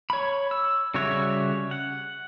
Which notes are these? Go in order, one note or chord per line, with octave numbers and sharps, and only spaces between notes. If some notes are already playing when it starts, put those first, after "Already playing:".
C#5 B5
E6
C#3 G3 F#4 C#5 E5
F#5